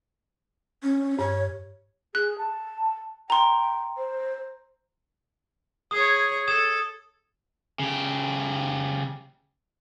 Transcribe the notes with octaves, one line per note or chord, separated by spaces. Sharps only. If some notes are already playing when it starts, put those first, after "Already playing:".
C#4
G2 C#5
G#4 F#6
A5
G5 A#5 C6
C5
G#4 C#5 D#6
A4 D#6 G#6 E7
C#3 G4